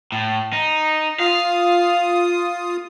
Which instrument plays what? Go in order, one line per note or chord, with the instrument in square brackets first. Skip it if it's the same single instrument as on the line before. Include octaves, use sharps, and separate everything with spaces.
[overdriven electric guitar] A2
D#4
[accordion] F4 D#6 [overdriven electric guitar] F5